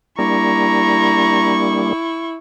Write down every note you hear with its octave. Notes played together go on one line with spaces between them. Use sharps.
G3 A#3 D4 E4 A#5 C#6